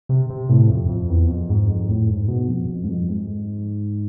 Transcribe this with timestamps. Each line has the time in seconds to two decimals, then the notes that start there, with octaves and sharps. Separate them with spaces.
0.09 C3
0.30 C3
0.49 A2
0.70 F2
0.89 F2
1.10 E2
1.29 F2
1.49 G#2
1.68 F2
1.88 A2
2.09 G#2
2.28 B2
2.48 F2
2.69 F2
2.84 G#2
2.89 F2
3.09 G#2